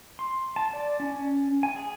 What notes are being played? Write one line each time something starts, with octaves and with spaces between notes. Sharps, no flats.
C6
A5
D5
C#4
G#5
G#4